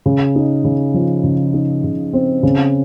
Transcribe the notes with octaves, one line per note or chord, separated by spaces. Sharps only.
C#3
D#4
C#3
F3
C#3
D#4
C#3
C4
C#3